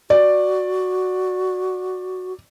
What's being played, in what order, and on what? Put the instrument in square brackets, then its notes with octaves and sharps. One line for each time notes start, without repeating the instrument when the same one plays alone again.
[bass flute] F#4 [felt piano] D5